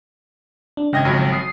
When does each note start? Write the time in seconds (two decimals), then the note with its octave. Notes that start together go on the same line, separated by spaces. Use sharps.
0.77 D4
0.93 G#1 C#3 D#5 G5 G#6 A#6
1.05 G#1 F2 F#3
1.32 D#6 C7